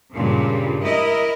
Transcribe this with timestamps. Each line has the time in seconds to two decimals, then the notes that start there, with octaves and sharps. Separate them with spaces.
0.12 G2 A#2 C#3
0.85 E4 A#4 D#5